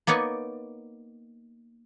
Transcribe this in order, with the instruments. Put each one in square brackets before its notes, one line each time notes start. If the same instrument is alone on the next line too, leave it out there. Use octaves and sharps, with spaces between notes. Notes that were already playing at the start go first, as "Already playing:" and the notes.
[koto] A#3 B3 D#4 C#5 D5